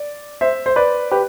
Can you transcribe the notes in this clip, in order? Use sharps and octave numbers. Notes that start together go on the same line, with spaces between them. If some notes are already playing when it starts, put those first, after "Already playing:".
Already playing: D5
C5 E5
C5
B4 D5
G4 B4